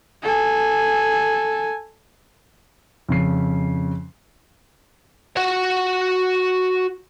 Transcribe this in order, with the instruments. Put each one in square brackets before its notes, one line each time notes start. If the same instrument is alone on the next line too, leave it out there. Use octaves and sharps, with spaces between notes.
[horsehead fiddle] A4 G#5
[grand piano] F2 C#3 C7
[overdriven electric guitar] F#4 F#5